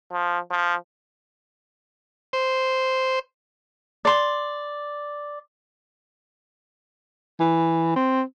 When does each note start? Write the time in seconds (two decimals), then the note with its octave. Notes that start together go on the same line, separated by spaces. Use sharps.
0.12 F3
0.50 F3
2.33 C5
4.05 D5 C6
7.40 E3
7.96 C4